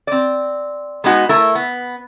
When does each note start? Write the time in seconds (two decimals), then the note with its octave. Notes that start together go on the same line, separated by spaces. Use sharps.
0.07 C4 D5
1.04 G#3 B3 D#4 F#4
1.29 A3 E4 A#4
1.55 B3